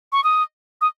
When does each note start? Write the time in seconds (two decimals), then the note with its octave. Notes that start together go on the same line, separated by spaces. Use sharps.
0.12 C#6
0.24 D#6
0.81 D#6